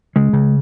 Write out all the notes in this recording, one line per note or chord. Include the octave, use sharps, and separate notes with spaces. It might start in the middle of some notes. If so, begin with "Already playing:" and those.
C#3 G#3
C#3